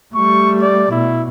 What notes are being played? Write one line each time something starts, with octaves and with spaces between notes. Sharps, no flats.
G3 A3 C#6
D5
B2 E4